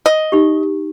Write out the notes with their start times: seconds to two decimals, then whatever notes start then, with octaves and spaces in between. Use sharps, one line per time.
0.06 D#5
0.32 D#4 G4